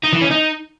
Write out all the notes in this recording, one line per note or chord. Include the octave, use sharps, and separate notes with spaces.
D#4
E3
C#4
D#4